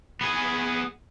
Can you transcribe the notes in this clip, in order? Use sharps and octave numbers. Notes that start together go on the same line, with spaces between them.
B3 G#4